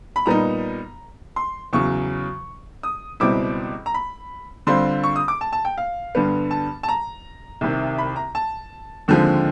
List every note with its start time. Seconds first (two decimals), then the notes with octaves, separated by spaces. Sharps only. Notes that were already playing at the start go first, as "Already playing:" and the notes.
0.16 B5
0.26 A#2 G3 B3 D#4 A#5
1.36 C6
1.73 E2 C#3 F#3 C#6
2.83 D#6
3.20 C#2 B2 G3 C4 E4 D6
3.86 A#5
3.94 B5
4.67 D3 G3 C4 F4 C6
5.04 C#6
5.16 D#6
5.28 D6
5.41 A5
5.53 A5
5.65 G5
5.77 F5
6.15 G2 D3 G3 B3
6.51 A5
6.83 A5
6.88 A#5
7.61 C2 C3 D#3
7.98 B5
8.16 A#5
8.35 A5
9.08 D#2 D3 F3 G#3 C4